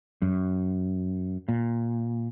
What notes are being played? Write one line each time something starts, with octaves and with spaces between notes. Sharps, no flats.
F#2
A#2